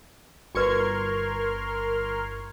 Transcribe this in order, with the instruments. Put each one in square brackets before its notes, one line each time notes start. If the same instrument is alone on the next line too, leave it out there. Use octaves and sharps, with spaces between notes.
[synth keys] G1 C#6 G#6 [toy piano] F#4 B4 [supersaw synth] A#4 C6 F6